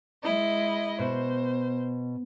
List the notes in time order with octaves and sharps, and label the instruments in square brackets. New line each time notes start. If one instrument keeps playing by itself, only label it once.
[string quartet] G#3 E4 D#5
[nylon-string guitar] B2 [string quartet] C5